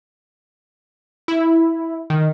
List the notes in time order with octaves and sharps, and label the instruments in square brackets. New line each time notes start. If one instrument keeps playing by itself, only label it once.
[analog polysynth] E4
D#3